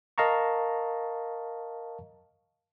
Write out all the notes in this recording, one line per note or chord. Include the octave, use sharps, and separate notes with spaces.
A#4 D#5 F5 A5 A#5 C#6